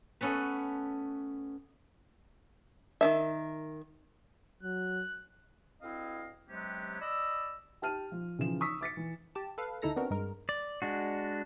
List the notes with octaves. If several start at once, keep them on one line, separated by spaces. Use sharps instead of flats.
A3 B3 C#4 A4 B4
D#3 E3 E5
F#3 F#6
D2 C4 E4 D#5 F5
C3 F#3 G#3 B3 C#4 G4
D5 D#5 B5 E6
G4 A5 F6 D#7
F3
C#3 E3 F3 E7
C#6 D#6 E6 B6
D6 A6 B6 C#7
E3
G4 A5
A4 B4 F5
D2 D#4 E4 A4 A#5 A#6
B3 C4 D4 F#4 A#4
G2 G#3 A#4
D5
G#3 D4 F#4